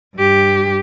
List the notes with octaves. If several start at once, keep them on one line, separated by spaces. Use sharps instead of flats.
G2 G4